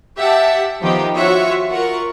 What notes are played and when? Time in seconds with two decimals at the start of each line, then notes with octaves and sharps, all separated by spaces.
0.17 G4 E5 F#5 A5
0.81 D#3 F3 B3 D#4 G4
1.16 F4 F#4 C#5 E5 C#6
1.71 F4 A#4 F#5 C#6